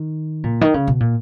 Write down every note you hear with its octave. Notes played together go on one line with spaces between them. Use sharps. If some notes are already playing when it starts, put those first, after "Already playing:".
Already playing: D#3
A#2
D#3
C#3
B2
A#2